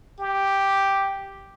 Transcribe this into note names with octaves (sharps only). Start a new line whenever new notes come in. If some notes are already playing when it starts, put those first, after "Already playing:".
G4